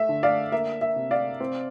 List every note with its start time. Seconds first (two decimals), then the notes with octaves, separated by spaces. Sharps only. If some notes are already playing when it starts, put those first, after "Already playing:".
Already playing: A3 E5
0.09 D3
0.23 D5 F5
0.52 A#3 E5
0.81 E5
0.96 C3
1.11 D5 F5
1.40 C4